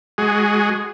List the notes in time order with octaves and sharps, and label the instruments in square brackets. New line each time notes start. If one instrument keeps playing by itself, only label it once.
[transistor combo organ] G#3 F#4 G#4